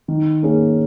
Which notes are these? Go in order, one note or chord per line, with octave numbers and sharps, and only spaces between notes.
D#3
A#3 C#4 G#4